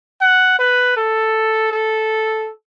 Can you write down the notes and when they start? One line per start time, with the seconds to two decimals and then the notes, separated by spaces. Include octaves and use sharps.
0.21 F#5
0.59 B4
0.96 A4
1.72 A4